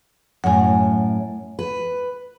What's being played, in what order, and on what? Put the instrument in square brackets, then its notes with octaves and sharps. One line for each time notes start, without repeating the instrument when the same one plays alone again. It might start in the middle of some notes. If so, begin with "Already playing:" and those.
[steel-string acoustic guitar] F#2 A2 [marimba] F#5 G#5
[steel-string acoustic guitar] B4